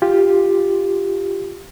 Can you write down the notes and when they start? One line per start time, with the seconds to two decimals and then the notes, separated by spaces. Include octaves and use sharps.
0.02 F4 G4